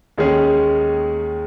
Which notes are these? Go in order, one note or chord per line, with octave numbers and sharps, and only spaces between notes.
D#2 D#3 G#3 C#4 G#4